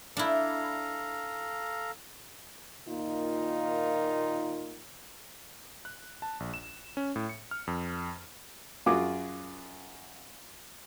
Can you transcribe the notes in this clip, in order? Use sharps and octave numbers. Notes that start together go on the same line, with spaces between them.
D4 E4 A4 F5 A#5
A#2 D#3 A#3 D#4 F4
F#6
A5
A#1
E7
C#4
A2
C#7
F6
F2
F#2 F4 F#4 G#4 D6